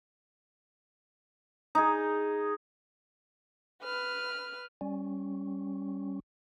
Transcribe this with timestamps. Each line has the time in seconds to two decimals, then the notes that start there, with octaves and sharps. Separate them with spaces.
1.75 D#4 G#4
3.83 B4 F6
4.81 G3 C#4